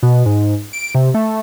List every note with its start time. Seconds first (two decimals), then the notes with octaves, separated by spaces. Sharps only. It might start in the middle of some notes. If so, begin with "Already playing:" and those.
0.03 B2
0.26 G#2
0.73 D7
0.95 C3
1.14 A3